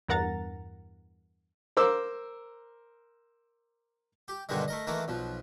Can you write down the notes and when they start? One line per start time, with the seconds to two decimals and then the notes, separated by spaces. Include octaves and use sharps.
0.08 E2 G2 A#4 F#5 A#5 A6
1.77 A#4 C5 D6 E6
4.28 G4
4.49 G2 B2 D3 D#3 G3 G#3
4.68 A3 A#4 D#5
4.87 D#3 E3 A3 A#3 A#4
5.08 B1 F3